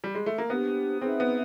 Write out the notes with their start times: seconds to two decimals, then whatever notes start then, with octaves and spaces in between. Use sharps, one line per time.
0.04 G3
0.15 G#3
0.26 A3
0.38 A#3
0.49 B3 D4 G4 C5
1.01 C4 D#4 G#4 B4 E5
1.20 B3